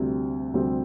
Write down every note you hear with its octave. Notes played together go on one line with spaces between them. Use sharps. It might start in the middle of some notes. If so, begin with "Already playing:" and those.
Already playing: D2 C3 G3 C4
D2 C3 G3 C4